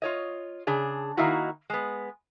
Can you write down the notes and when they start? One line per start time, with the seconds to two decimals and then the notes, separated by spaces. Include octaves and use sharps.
0.02 F4 C#5 D#5
0.67 C#3 D4 G#4
1.17 D#3 A#3 D#4 E4 F#4
1.70 G#3 B3